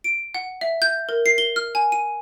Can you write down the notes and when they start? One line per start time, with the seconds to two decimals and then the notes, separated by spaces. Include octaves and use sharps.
0.04 D7
0.35 F#5
0.61 E5
0.82 G6
1.09 A#4
1.26 C7
1.38 G7
1.56 F6
1.75 G#5
1.92 D#7